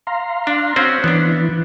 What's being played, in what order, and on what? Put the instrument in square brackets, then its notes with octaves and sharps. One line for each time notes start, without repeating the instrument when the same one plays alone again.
[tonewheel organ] F5 A#5 C6
[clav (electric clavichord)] D4
C4 C#4 F#4
[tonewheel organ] E3 [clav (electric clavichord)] B3 D4